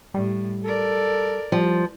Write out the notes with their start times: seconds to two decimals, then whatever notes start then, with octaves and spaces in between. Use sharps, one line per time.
0.14 A2 G3
0.65 A4 A#4 D5
1.52 F3 G3